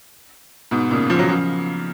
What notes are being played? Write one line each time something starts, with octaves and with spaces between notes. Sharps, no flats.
G#2 B2
A#2 C#3
C#3 F3
F#3
C#3 F3